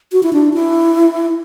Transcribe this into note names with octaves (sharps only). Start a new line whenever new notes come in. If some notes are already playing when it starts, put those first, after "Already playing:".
F#4
E4
D4
E4